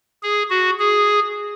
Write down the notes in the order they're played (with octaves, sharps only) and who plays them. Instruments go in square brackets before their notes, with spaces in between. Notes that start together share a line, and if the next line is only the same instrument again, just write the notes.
[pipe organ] G#4
F#4
G#4